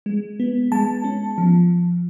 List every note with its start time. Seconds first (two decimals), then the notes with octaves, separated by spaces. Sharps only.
0.06 G#3
0.40 B3
0.72 G#3 A5
1.04 C#4
1.38 F3